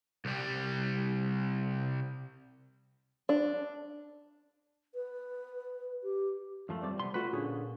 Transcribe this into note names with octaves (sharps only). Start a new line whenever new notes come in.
C2 G3
D4
B4
G4
F#2 F3 A3
G3 C4 D5
C2 B3 C6
A3 F4 F#4 B4
A#2 D3 C#4 G#4